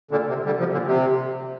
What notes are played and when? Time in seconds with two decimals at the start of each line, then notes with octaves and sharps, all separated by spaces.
0.11 A#2 D3
0.28 C3
0.46 D3 G3
0.59 C3 F3
0.72 A#2 D3
0.86 C3